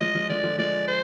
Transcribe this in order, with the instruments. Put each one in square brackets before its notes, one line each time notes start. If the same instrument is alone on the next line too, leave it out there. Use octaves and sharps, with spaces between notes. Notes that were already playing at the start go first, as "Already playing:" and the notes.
[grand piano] F3 G#3 [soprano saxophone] D#5
[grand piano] F3 G#3
[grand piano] D3 F3 [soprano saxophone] D5
[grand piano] D3 F3
[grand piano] F3 G#3 [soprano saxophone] D5
[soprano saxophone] C5